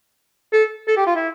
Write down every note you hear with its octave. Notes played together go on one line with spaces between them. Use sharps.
A4
A4
G4
F4
E4